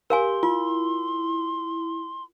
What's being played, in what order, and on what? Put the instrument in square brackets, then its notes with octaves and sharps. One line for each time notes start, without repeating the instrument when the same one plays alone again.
[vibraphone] G4 [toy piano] A#4 F5 G#5 [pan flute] C6
[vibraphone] E4 [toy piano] F4